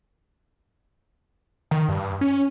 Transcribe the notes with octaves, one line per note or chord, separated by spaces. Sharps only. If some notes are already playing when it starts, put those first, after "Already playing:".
D#3
G2
C#4